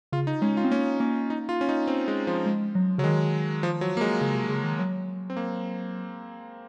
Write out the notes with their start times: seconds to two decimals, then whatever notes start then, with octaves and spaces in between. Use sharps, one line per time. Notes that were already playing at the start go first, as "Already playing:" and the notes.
0.12 C#3 F4
0.27 D#4
0.42 G#3 C#4
0.57 F4
0.65 C4
0.71 A#3 C#4
1.00 A#3 C#4
1.30 D#4
1.49 F4
1.61 C#4
1.69 D#4
1.87 C4
2.08 G#3
2.27 F3
2.46 G#3
2.75 F#3
2.98 C#3 F#3
3.04 D#3 G#3
3.63 F3
3.81 F#3
3.97 A#3
4.01 G#3
4.21 C#3
4.35 C3
4.49 C#3
4.64 D#3
4.79 F#3
5.30 C4
5.37 A#3